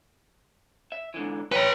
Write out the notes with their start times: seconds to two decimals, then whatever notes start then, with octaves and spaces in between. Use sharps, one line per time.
0.92 E5
1.14 G#2 D3 E3
1.52 B4 C#5 G5 A#5